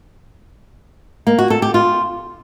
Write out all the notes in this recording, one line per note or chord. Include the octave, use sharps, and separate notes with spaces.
A#3
F#4
A4
G4
F4